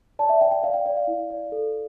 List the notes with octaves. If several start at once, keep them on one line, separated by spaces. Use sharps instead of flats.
D5 A5
E5
D5 G5
G5
D5 F5
G5
D5
F5
E4
D5
A4